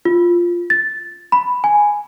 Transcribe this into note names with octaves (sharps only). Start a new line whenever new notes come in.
F4
A6
B5
G#5